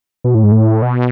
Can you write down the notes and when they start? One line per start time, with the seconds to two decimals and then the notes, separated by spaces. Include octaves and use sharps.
0.24 B2
0.35 A2
0.43 G#2
0.52 A2
0.82 B2